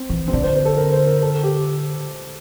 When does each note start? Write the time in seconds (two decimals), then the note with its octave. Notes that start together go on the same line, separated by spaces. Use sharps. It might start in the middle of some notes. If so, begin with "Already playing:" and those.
Already playing: C4
0.10 E3
0.28 C4
0.33 D3 D4
0.43 C5
0.55 C5
0.65 A4
0.77 A#4
0.92 C5
1.07 A#4
1.22 A4
1.44 G4